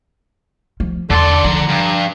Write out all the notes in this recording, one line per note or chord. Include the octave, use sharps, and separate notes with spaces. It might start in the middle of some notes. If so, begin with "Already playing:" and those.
F3
E2 D3 A4 D5 C6
F3 A#5
G2